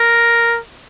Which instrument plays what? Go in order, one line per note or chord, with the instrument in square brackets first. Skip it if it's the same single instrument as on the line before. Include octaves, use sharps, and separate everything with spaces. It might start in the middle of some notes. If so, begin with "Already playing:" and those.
Already playing: [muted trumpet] A#4